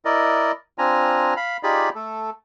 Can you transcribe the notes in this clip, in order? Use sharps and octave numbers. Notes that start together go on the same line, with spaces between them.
E4 A#4 D5 D#5
C4 D4 F4 G#5 A#5
F5 B5
D#4 F4 G4 G#4 D5 B5
A3 A4